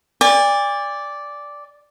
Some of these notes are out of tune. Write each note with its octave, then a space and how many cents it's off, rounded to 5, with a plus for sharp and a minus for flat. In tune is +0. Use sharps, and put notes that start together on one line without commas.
D5 -5 G#5 -45